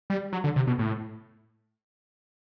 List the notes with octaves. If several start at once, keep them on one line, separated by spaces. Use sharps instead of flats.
G3
F#3
D3
C3
B2
A2